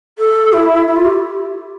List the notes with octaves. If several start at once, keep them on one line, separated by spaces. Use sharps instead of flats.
A4
E4
E4
F4
G4